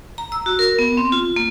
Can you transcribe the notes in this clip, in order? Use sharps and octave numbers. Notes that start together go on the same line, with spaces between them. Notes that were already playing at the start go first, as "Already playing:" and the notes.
A#5
E6
F#4
A#4
B3
C4
F4
A#3